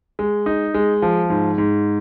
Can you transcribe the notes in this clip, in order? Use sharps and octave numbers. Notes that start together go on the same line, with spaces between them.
G#3
D#4
G#3
F3
G#2
G#2